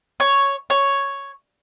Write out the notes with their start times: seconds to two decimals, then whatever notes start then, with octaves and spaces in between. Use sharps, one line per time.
0.20 C#5
0.70 C#5